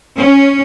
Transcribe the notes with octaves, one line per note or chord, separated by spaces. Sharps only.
C#4